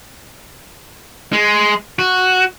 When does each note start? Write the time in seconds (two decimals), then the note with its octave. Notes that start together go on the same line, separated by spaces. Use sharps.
1.33 G#3
1.99 F#4